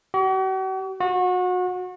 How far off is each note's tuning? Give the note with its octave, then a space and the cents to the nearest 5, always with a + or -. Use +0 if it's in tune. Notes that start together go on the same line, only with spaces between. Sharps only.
F#4 +45
F#4 -30